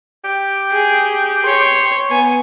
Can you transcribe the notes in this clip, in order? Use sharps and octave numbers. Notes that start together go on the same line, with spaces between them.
G4
G#4
C#5 C6
B3 G#5